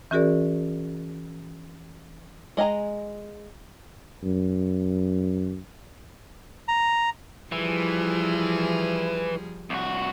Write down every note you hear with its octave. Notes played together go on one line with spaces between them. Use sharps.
E3 C#4 F#4 G#4 A#4 D5
G#3 D#5 G#5 A#5
F#2
A#5
E3 F3 G3 G#4
C2 F#4